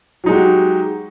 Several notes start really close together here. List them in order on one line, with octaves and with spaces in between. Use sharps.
F#3 D#4 G#3 F#4 G4